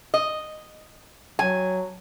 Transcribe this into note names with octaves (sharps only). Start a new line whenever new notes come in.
D#5
F#3 G#5